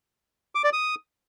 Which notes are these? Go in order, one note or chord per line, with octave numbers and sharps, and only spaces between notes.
D6
D5
D#6